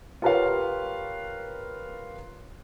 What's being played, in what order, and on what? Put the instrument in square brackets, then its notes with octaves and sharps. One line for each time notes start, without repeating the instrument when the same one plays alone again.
[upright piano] F4 G4 A#4 B4 C#5 F5